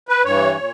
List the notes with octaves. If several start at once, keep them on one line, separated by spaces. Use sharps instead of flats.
B4
G2 E3 C#5
A#2